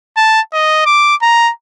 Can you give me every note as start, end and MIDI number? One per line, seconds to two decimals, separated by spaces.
0.17 0.41 81
0.53 0.84 75
0.86 1.15 86
1.22 1.51 82